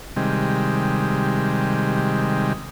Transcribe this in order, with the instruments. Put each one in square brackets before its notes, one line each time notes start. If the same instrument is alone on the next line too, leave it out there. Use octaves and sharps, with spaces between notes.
[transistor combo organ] C3 D#3 G3 G#3